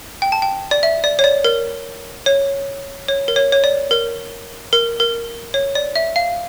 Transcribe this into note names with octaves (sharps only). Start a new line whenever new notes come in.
G5
A5
G5
D5
E5
D5
C#5
D5
A#4
C#5
C#5
A#4
C#5
C#5
D5
A#4
A#4
A#4
C#5
D5
E5
F5